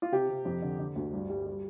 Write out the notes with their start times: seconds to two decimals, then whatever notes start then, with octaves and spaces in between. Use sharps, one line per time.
0.02 F4
0.12 C3 G4
0.29 C3
0.45 F2
0.62 D3
0.79 D3
0.96 D2
1.13 G2
1.30 G3
1.47 G3